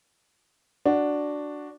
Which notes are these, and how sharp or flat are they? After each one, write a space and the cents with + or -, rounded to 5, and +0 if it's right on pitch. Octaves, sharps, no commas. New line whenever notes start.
D4 +0 F#4 +0